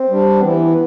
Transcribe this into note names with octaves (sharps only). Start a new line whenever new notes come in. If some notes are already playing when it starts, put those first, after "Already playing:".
Already playing: C4
G3 D4
E3 B3